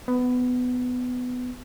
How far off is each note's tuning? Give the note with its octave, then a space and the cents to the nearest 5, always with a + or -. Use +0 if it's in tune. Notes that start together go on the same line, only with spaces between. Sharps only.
B3 +15